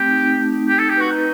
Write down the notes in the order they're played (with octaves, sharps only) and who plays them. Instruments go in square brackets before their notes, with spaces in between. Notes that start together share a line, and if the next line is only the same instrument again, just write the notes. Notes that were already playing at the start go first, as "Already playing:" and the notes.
Already playing: [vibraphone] A3 C4 [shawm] G4
[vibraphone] D#4
D#4
A3
D#4
[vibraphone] D#4 [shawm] G4
[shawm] A4
[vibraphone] D#4
[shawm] G4
[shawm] F#4 [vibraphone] B4
[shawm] D#4 [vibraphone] B4